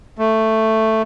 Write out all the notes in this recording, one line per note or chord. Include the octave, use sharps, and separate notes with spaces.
A3